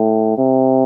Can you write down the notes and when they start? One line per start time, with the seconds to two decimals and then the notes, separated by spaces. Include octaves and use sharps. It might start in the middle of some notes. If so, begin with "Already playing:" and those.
Already playing: A2
0.37 C3